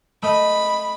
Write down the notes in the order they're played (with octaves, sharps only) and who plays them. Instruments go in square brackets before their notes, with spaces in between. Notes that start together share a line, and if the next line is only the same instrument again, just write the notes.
[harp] A3 D#5 [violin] B5